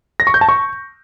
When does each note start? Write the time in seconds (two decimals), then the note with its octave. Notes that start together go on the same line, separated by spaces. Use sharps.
0.20 A#6
0.27 C#6
0.34 G6
0.41 A5
0.49 C#6